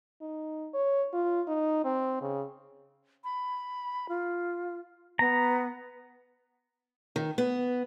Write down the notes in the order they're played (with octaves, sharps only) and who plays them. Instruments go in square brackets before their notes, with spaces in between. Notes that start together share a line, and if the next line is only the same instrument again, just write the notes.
[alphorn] D#4
C#5
F4
D#4
C4
C#3
[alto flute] B5
F4
[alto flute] B3 [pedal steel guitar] A#5
[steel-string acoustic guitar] D#3
B3